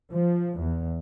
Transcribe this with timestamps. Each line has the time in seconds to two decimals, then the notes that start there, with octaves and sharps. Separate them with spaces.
0.12 F3
0.59 E2